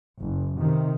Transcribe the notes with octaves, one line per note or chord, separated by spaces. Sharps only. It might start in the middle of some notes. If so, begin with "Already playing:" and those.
F#1
C3 D#3